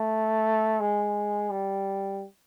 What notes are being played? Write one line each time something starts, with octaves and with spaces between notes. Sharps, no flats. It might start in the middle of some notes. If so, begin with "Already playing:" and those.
Already playing: A3
G#3
G3